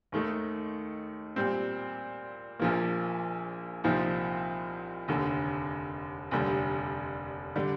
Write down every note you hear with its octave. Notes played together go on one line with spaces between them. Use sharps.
D#2 D#3 A3 D#4
A#2 G3 C4
A#1 A#2 F3 A#3
C2 A#2 F3 C4 D#4
F1 D#2 D3
F1 D#2 D3 G3
D3 G3 D4